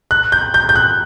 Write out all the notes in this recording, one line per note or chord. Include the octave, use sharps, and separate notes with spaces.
F#6
G6
G6
G6
F#6